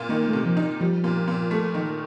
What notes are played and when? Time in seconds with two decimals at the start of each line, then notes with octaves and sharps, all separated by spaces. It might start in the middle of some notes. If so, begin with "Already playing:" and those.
Already playing: A#2
0.09 D#3 A#3
0.28 A3
0.33 C3
0.46 F3
0.57 D#4
0.80 F3 G3
1.04 A#2
1.28 A#2
1.51 A3
1.75 D#3